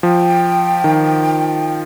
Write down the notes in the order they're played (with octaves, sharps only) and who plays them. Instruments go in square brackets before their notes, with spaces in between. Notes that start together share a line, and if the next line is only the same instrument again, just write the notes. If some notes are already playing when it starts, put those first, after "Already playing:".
[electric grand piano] F3 [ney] G5
[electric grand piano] D#3